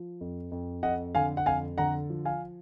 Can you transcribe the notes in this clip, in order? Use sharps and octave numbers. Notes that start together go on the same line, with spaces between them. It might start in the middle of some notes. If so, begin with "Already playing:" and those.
Already playing: F3
F2
F2
F2 D#5 F#5
D3 F5 G#5
F#5
F2 F5 G#5
D3 F#5 A#5
F3
F5 G#5